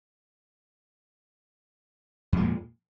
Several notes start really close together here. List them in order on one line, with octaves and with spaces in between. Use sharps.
F2 G#3 A#2